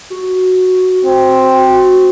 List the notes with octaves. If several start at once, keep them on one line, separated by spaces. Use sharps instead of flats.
F#4
C4